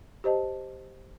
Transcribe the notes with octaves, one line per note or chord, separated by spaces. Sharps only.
G4 C5 D#5 A5